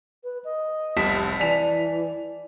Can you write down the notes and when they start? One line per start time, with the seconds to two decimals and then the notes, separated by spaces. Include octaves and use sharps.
0.24 B4
0.44 D#5
0.97 F1 C2 A5 B6
1.40 E3 D5 G#5 A5 B6 F7